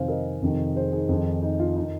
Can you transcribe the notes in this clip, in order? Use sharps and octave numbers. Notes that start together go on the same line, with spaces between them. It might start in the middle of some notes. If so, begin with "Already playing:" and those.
Already playing: F2 C3 D#3 C5 F5 G#5
A#4 D#5
F2 C3 D#3
G#4 C5
D#4 G#4
F2 D#3
D#4
F4
D#3 D#4